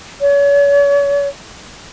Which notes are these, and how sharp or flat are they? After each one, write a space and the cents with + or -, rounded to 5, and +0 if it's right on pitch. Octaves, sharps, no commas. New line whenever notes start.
C#5 +40